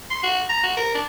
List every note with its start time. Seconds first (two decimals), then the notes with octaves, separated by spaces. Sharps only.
0.10 C6
0.23 F#4
0.49 A#5
0.63 F#4
0.77 A#4
0.94 D4